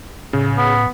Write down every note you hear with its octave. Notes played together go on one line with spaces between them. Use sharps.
A2 C#3
B3